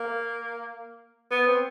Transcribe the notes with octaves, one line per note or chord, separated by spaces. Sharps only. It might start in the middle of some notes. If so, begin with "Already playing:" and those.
Already playing: A#3
B3
C4